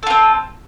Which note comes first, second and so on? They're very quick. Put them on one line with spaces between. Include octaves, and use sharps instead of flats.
A4 F4 C4